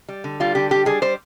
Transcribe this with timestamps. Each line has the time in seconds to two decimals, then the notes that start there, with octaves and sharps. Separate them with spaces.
0.09 G3
0.24 D3
0.40 G3 F4
0.55 D3 G4
0.71 G3 G4
0.86 G3 G#4
1.02 G3 C5